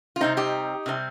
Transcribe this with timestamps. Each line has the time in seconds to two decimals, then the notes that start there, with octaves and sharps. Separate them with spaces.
0.16 F4
0.21 C3 G3 C4 D#4
0.37 D#4 G4
0.86 C3 G3 C4